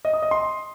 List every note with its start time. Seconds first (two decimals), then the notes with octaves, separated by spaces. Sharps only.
0.05 D#5
0.14 D#6
0.22 D#5
0.31 C6